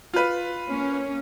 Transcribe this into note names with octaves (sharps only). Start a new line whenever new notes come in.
F4 B4
A#3 C#4